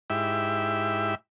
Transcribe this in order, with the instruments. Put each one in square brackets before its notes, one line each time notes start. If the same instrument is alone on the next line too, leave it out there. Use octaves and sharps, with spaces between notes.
[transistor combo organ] G#2 E4 G4 E5